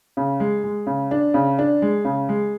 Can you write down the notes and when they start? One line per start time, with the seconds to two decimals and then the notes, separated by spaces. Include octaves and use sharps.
0.17 C#3
0.40 G#3
0.64 G#3
0.87 C#3
1.11 D4
1.34 C#3
1.59 D4
1.82 G#3
2.05 C#3
2.29 G#3